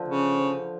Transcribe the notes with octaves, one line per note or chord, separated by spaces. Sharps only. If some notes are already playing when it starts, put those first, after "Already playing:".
Already playing: D3 F3
C#3
F3